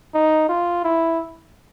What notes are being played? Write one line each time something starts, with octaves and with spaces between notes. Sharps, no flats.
D#4
F4
E4